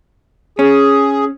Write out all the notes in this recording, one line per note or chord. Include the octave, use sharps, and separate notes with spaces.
C#4 G#4